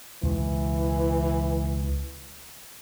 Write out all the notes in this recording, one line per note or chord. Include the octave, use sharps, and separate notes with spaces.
C#2 B2 E3